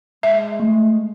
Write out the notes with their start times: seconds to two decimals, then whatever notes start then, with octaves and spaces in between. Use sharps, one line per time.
0.23 G#3 E5
0.60 A3